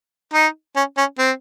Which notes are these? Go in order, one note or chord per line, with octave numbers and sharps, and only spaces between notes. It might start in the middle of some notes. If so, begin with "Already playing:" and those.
D#4
C#4
C#4
C4